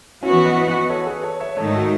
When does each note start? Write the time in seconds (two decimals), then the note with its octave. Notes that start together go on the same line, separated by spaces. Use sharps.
0.23 E3 B3 C#4 E4 F#4
0.45 B4 D#5
0.68 B4 D#5
0.90 A4 C#5
1.06 G#4 B4
1.23 A4 C#5
1.40 C#5 E5
1.57 G#2 D#3 A3 D#4 A4 C#5
1.74 F#4 A4